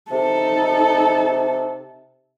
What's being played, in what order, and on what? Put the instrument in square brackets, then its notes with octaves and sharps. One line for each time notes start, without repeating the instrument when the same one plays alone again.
[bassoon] C3 [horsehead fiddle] D#4 A4